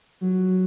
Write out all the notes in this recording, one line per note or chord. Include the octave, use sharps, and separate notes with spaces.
F#3